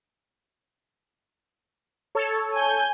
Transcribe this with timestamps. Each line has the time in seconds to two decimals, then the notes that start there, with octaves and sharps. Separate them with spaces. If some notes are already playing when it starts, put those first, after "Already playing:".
2.15 A4 C#5
2.55 G#5 G6